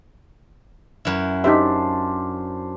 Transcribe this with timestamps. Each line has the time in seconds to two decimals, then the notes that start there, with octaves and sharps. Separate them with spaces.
1.05 F#2 E4
1.44 D4 D#4 G4 C5 E5